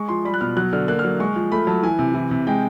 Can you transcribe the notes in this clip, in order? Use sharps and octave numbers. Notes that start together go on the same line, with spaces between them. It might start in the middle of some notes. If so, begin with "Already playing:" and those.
Already playing: G#3 C#6
F3 C6
G3 B5
F#6
B2 F6
F#3 F#6
D3 F6
A#3 F#6
F6
F#3
G#3 C#6
F3
A3 B5
F#3 A5
E3 G#5
C3
E3
C3
G#3 G5